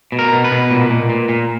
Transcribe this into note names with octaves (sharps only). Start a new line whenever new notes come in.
B2
A#4
B2
B4
B2
A#2
A#2
A#2
A#2